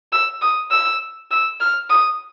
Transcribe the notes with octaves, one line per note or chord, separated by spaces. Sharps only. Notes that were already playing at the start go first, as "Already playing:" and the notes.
E6
D#6
E6
E6
F6
D#6